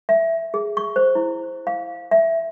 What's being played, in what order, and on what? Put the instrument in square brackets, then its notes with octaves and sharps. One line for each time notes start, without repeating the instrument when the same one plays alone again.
[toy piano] E5
G#4
C#6
C5
E4
F5
E5